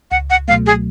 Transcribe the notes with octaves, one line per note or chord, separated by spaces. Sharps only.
C#2 F#5
F#5
B2 F#3 A3 F5
G#4